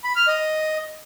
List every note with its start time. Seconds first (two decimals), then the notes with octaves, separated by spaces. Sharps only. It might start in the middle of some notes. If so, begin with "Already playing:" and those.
0.04 B5
0.16 F6
0.28 D#5